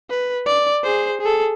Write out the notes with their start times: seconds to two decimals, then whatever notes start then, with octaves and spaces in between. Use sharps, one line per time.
0.10 B4
0.46 D5
0.83 G#4 C5
1.21 G#4 A4